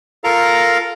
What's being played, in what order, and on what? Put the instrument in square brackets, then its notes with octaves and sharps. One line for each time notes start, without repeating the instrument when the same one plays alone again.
[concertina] F4 A4 A#4 F5 A#5